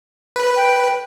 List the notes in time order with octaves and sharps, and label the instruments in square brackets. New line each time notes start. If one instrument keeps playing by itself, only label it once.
[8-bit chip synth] B4
[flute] G5